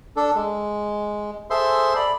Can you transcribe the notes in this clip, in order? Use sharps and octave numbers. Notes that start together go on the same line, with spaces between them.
D4 A4
G#3
G#4 A4 C5 E5 C6
D5 B5